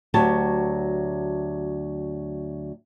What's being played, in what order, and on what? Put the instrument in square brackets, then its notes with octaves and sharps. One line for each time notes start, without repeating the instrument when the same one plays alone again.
[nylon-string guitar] D2 F#3 G4 A5